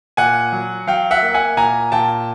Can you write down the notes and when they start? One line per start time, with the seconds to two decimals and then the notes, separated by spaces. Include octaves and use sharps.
0.17 A#2 F#5 G#5
0.52 F#3
0.87 F#3 F5 G5
1.11 E5 F#5
1.22 A#3
1.34 F#5 G#5
1.57 A#2 G#5 A#5
1.92 A#2 G5 A5